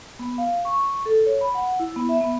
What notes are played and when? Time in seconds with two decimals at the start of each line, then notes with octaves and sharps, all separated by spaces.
0.19 B3
0.38 F5
0.65 C#6
1.06 A4
1.26 C#5
1.41 B5
1.55 F#5
1.80 E4
1.96 B3
2.09 E5
2.21 B3